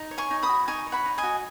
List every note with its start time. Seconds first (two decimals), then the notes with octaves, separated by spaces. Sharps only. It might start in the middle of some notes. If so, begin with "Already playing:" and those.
Already playing: D#4
0.11 C#5
0.18 G#5 C#6
0.31 D#4
0.43 B5 D#6
0.49 F#4
0.67 D#4 G#5 C#6
0.87 C#5
0.92 F#5 B5
1.06 D#4
1.18 D#5 G#5
1.23 F#4